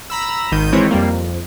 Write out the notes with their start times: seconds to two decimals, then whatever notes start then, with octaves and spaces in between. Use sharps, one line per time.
0.10 A#5 B5 E6
0.52 G#1 D#3 G6 D#7
0.72 D#3 E3 G#3 C4 E4 C#5
0.90 F2 G3 A#3
1.11 F2